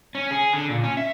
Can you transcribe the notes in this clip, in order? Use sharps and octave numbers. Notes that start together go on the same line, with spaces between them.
C#4
G#4
D3
A#2
C#4
E5